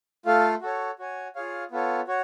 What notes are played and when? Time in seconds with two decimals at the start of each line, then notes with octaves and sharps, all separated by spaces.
0.26 A3 F4 A4 F5
0.62 F#4 A4 C#5
0.99 F#4 C#5 G#5
1.35 F4 G#4 C#5 F5
1.71 B3 F4 A4 C#5
2.08 F#4 C#5